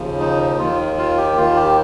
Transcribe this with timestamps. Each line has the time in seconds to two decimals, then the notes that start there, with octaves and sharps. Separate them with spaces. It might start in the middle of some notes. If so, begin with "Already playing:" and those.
Already playing: D#2 C#3 F3
0.20 D#4
0.58 D#2 D#3 F4
0.98 F4
1.18 G4
1.37 D#2 D#3 F4
1.56 G4